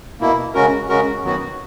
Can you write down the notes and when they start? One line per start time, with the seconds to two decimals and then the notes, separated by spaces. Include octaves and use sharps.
0.20 B2 A#3 E4
0.54 C#3 G#3 C#4 F#4 A#4
0.89 C#3 G#3 C#4 F#4 A#4
1.23 F#2 D#3 F#3 B3 F#4